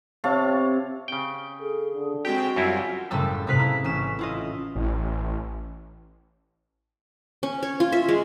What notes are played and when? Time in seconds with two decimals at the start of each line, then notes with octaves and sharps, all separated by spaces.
0.24 C3 C#5 F5 A5
1.08 C#3 G5
1.60 G#4 A4
1.94 D3
2.25 G#3 C4 F#4 G4 G5
2.56 F#2 F#3 G3 C4 E4 F4
3.11 F#1 A2 G3 A5 E6
3.47 G#2 C3 D#4 B4 F5 B6
3.59 E4
3.84 A1 C#4 B6 E7
4.19 E4 F4 D#5
4.75 A1
7.43 C#4
7.63 C#5
7.80 F4
7.92 E5
8.08 G#3